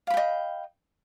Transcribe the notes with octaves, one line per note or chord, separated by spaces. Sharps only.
D#5 F5 G5 B5